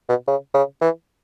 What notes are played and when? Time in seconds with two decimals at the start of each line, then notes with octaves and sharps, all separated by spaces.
0.09 B2
0.27 C#3
0.54 C#3
0.81 E3